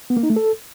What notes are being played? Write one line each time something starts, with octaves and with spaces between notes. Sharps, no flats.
B3
A#3
D#4
A3
A4